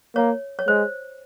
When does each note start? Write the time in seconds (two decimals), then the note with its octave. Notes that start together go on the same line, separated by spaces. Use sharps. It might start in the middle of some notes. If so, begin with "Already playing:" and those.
0.15 A#3 C#5
0.59 C#5
0.67 G#3 C5